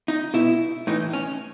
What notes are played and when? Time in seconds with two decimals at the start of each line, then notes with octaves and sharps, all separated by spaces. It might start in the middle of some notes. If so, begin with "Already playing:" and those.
0.08 D#4
0.34 B2 E4
0.87 A2 E3 D#4
1.13 C#4